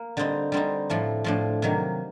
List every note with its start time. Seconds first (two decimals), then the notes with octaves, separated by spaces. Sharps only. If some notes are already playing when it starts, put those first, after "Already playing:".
Already playing: A#3
0.17 D3 G3 C4 D#4
0.52 D3 G3 C4 D#4
0.89 A2 F3 A3 D4
1.24 A2 F3 A3 D4
1.62 C3 D#3 F#3 A#3